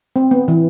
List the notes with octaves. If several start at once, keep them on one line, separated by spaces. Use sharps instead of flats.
C4
B3
E3